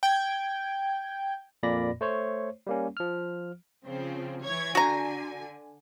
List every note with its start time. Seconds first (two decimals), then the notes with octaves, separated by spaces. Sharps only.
0.03 G5 G#6
1.63 F2 A#2 A#3 D5 B5 A#6
2.01 A3 C5 C#5
2.67 G3 A#3 C#4
2.97 F3 F6
3.85 C#3 F3 C4
4.44 E3 C#5 G#6
4.75 D3 F#4 G#5 A#5